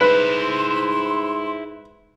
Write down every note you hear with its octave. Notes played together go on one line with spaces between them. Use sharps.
G#2 E4 B4 C5 C6